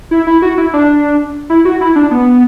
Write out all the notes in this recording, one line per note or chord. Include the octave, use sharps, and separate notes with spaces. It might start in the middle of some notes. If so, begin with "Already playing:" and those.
E4
E4
F#4
E4
D4
E4
F#4
E4
D4
B3